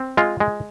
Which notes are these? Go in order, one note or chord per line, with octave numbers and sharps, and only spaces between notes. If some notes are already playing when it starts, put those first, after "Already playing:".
Already playing: C4
G#3 F4
G#3